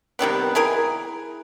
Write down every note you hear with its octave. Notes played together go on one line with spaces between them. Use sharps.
C3 D#3 G3 B3
E4 G#4 A#4 G#5